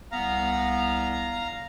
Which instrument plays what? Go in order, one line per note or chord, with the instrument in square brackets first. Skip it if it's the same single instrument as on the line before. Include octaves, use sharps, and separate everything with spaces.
[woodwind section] C2 B3 [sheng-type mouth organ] F5 A#5